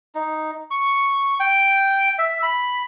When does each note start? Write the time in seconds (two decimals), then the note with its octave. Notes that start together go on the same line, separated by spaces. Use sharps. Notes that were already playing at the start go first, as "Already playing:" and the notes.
0.15 D#4
0.71 C#6
1.40 G5
2.19 E5
2.43 B5